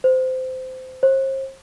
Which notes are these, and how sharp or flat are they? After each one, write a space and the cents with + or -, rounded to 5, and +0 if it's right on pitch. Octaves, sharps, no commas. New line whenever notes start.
C5 -20
C5 +40